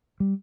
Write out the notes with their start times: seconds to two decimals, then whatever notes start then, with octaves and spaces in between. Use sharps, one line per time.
0.20 G3